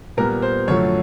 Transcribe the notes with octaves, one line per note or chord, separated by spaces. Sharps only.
A#2 G3 B3 A#4
C5
F#2 D3 F3 A3 C#5